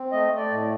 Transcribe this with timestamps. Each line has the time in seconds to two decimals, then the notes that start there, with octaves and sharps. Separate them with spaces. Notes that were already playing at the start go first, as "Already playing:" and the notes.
Already playing: C4
0.12 A3 D#5
0.32 A3
0.37 D5
0.51 A2